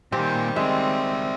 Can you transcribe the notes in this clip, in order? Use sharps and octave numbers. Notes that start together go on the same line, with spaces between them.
A#2 D#3 G3 C4 G4
G#3 C4 D5 E5